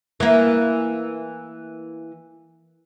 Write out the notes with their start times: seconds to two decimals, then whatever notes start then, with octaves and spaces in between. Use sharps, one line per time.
0.20 E3 A#3